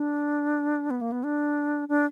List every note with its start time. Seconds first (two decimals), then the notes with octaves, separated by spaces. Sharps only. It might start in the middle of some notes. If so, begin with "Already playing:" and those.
Already playing: D4
0.90 B3
1.01 A#3
1.12 B3
1.24 D4
1.89 D4